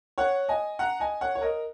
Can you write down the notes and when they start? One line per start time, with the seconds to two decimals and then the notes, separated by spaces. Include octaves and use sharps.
0.18 C#5 F#5
0.49 D#5 G#5
0.79 F#5 A#5
1.00 D#5 G#5
1.21 C#5 F#5
1.35 C#5
1.41 A#4 D#5